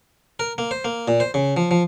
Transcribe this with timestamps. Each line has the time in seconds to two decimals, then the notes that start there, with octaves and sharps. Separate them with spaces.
0.40 A#4
0.58 A#3
0.71 C5
0.85 A#3
1.08 A#2
1.20 C5
1.34 C#3
1.57 F3
1.71 F3